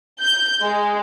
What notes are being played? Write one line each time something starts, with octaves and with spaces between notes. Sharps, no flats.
G6
G#3